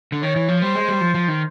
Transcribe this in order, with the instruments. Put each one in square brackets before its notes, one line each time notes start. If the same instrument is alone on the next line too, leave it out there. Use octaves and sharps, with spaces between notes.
[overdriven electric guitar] D3
[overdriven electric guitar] D#3 [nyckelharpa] C#5
[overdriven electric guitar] E3
F3
[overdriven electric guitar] G3 [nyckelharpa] C5
[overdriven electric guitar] G#3
G3
F3
F3
D#3